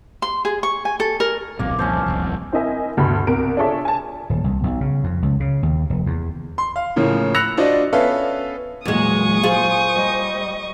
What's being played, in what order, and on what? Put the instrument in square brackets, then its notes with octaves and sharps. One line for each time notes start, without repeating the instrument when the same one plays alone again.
[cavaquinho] C6
G#4
C#6
G#5
A4
A#4
[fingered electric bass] D#1 B1 C3 [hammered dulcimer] A#3
[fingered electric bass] C2 F2 A#2 [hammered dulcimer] C#4 A4 C5
[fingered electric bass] D#1 C2 F2
[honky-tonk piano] C4 E4 A#4 D#5 E5 G#5
D2 G2 B2 B5
C2 A#4 D7
D4 F4 G#4 A4 C#5 E5
G#5 A5
[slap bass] D#1
C2
B1
C#3
F2
C#2
C#3
D#2
F1
E2
[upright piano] C6
F5
A2 C#3 F3 A#3
B5 E6 F#6 A#6 C#7 F7
D4 F4 F#4 C5 D5 D#5
B3 C#4 A4 B4 E5 F5
[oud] E2 G#3 [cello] A#2 F#3 [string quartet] C#6 D#6
[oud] F4 G#4 [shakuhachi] C5
[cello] G3 D#5